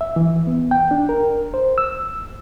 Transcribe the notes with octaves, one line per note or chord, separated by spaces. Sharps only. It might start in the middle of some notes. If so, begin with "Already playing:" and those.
E5
E3
B3
G5
D4
A#4
C5
E6